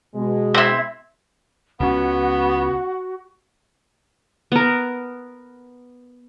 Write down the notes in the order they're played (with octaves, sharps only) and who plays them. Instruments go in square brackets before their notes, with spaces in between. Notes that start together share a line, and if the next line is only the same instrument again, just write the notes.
[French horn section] B2 G#3
[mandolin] C4 E4
[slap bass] C#2 C#4 [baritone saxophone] B3 [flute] F#4 [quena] F#5
[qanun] B3 A#4